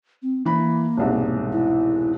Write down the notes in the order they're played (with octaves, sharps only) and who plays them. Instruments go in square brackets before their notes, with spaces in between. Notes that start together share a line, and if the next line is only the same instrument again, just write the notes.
[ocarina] C4
[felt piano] E3 B5 [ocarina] A#3
[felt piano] E1 C2 G#2
[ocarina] E4